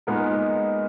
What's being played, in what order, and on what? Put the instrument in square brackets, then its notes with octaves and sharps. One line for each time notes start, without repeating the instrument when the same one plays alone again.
[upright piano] A#2 G#3 B3 D#4 A#4